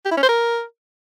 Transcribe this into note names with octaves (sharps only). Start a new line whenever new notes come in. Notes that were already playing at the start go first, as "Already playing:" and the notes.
G4
E4
C#4
C5
A#4